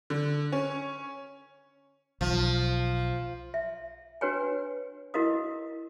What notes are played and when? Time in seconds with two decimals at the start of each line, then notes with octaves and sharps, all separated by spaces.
0.10 D3
0.52 C#4
2.21 B1 F3
3.54 E5
4.21 D4 F#4 B4 C#5 G5 G#5
5.14 E4 F#4 A#4 D#5 F5 D#6